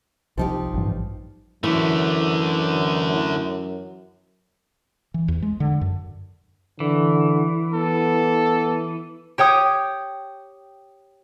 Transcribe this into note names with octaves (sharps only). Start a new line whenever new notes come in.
C2 F3 D#4 G4
A1 G2
F#2 D3 E3 A3
E3
E2
G#3
D3
F#2
D3 E3
B3 A4
G4 C#5 G5 D#6